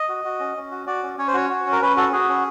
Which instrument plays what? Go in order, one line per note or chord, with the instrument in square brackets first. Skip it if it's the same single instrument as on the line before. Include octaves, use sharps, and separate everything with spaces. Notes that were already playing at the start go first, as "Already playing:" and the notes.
Already playing: [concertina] D#5
F#4
F#4
C#4
C#4
F#4
F#4 D5
C#4
C#4 C#5
C5
F#4 C#5
F#4
C#4
A#4
C#4 B4
F#4 A4
F#4 G#4
C#4